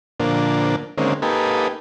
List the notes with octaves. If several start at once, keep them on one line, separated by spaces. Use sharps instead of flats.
A#2 D3 F3 A#3 D4
D3 D#3 G#3 A#3 C4 C#4
A#3 D#4 G4 A4 B4 G#5